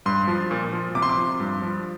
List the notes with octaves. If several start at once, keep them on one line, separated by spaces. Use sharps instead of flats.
G2 C6
F3
A#2
F3
C3 D6
C6
D6
F3
G2
F3